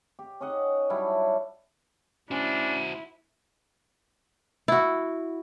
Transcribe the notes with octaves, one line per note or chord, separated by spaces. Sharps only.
G4
C#4 D#4 D#5 F#5
F#3 G3 D4 E4
C#4 D4 E4 F#4 C5
E4 F#4